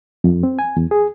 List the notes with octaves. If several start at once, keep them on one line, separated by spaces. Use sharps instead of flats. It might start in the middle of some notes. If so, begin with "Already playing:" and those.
F2
C4
G#5
E2
G#4